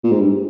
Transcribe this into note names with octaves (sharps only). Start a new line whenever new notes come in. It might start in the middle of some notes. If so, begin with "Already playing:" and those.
A#2
G#2
G2